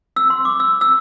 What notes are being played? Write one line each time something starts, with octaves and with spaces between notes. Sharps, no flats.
E6
C6
D6
E6
E6